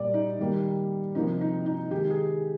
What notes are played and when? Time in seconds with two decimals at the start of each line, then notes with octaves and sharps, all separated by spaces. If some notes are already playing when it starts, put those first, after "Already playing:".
Already playing: A#2 G3 A#3 D5
0.14 D#4
0.39 D#3 G3 A#3
1.15 C3 F3 A#3 D#4
1.41 D#4
1.66 D#4
1.91 D#3 G#3 G4
2.10 G#4